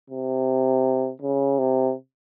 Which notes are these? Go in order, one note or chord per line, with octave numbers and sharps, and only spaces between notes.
C3
C#3
C3